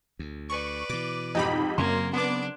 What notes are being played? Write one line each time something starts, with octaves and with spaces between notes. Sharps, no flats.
D2
B4 D5 C#6
B2 E3 D6
F2 G#2 D#4 G4 B5
F#2 C#3 F#3 A#3 C4 C6 G#6
B3 D4 D5 D6